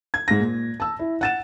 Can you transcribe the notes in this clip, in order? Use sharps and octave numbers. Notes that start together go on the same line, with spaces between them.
G#6
G#2 A#6
A#2
A5 E6
E4
F#5 A6 E7